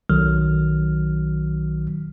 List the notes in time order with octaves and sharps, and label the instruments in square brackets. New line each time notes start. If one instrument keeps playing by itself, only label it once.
[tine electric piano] B1 D#3 F#3 F6